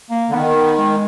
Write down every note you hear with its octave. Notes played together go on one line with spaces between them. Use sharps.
A#3
D3
D#3 B3
B3
G#3